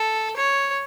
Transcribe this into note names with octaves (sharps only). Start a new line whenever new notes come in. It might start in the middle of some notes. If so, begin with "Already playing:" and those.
Already playing: A4
C#5